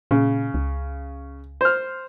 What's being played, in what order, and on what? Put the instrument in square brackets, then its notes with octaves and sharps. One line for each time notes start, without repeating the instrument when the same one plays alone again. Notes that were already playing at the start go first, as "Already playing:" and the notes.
[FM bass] A#2 [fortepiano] C#3
[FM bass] C#2
[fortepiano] C5 F6